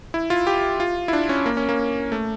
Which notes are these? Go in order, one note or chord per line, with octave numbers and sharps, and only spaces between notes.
E4
F4
G4
F4
E4
D4
C#4
A#3
C#4
A#3
A3